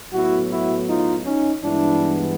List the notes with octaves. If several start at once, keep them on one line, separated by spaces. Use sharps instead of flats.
A2 F#3 B3 E4 F#4
E4 F#4
D#4 F4
C#4 D#4
G2 E3 G#3 B3 D4 E4